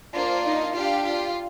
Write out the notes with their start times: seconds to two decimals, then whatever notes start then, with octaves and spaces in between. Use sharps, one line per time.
0.15 A#3 D4 F4 C5
0.45 D#4 D#5
0.75 D4 F4 G4 F5
1.06 F4 F5